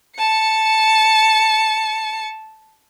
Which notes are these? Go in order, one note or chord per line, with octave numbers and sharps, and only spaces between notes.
A5 C#7